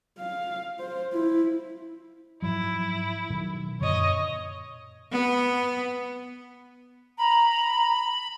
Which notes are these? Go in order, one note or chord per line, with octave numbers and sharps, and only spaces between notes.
F5
C5
E4
G#2 F3 F#3 E4
B2 D#3 F#3
F#2 A#2 D3 C#5 D#5
B3
A#5 B5